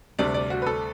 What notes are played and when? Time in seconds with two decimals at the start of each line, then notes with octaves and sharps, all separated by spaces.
0.19 D2 C3 G3 D4 D5
0.34 D5
0.50 F#4
0.62 B4
0.67 A4